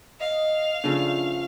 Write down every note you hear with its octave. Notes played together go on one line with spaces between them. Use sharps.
D#5 F5
C#3 F3 A3 D4